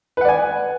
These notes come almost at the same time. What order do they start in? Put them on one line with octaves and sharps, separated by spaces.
B4 F#5 D5 G#5